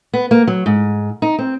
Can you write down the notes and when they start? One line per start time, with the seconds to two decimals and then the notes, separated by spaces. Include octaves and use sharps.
0.13 B3
0.31 A#3
0.47 F#3
0.66 G#2
1.22 D#4
1.39 C4